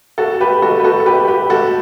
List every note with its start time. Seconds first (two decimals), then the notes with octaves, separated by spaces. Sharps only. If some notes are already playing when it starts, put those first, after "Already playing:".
0.18 F#4 A4
0.40 G4 B4
0.62 F#4 A4
0.80 B4
0.84 F#4 A4
1.00 A4
1.06 G4 B4
1.28 G4 B4
1.50 F#4 A4